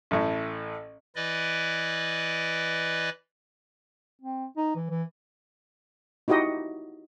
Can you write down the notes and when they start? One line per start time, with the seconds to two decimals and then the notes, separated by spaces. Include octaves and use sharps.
0.11 A1 A2
1.16 E3 E4 B4 D5 D#5
4.21 C4
4.57 D#4
4.75 E3
4.90 E3
6.28 D#4 E4 F#4 G4 D#5